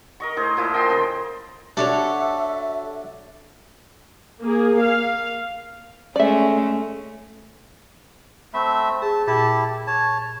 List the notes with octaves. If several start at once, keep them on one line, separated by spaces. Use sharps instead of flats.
A#4 D#5 C#6
A2 G#4 C5
A#2 F3 E4
D#5 G5 A5 C6
C#3 C6
D4 F#4 A4 C#5 E5
A#3 G#4
F5
G#3 A3 C#4 D5 E5
A3 C4 E5 B5
G#4 A5
A#2 E4 G4 A5
C#5 A5